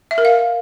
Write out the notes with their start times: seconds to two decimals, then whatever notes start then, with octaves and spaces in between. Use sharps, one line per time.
0.11 E5
0.18 A#4
0.25 F5